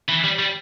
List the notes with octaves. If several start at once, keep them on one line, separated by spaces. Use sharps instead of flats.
E3
G3
G3